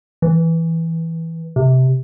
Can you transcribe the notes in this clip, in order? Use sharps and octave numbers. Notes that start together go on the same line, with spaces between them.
E3
C3